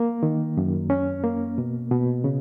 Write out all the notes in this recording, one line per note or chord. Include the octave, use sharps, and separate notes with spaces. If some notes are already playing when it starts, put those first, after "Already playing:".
Already playing: A#3
D#3
F#2
C#4
A#3
B2
B2
C#3